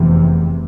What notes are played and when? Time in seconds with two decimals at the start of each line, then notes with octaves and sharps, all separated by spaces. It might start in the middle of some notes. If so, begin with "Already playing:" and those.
Already playing: F1 E2 C3